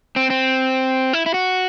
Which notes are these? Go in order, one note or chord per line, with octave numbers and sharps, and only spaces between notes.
C4
C4
E4
E4
F#4